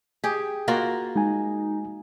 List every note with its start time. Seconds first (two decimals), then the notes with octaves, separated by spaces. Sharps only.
0.24 G4 G#4
0.68 A#3 F4 F#4
1.16 G#3 D#4 G#5